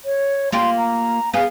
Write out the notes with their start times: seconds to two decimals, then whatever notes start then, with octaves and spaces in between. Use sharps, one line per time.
0.05 C#5
0.52 A#3 F4 G4 C6
0.78 A#5
1.33 B3 G#4 F5